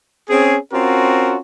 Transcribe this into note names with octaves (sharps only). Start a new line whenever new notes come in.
C4 C#4 G#4
C4 C#4 F4 F#4 A#4